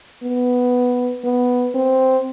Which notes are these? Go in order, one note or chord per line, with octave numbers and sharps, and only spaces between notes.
B3
B3
C4